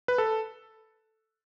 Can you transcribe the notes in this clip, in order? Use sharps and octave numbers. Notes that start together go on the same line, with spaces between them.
B4
A4